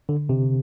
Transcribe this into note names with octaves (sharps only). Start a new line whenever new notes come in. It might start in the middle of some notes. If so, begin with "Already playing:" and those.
D3
C3